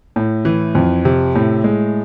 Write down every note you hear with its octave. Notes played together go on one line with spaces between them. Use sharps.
A2
E3
F2
C3
A2
G#3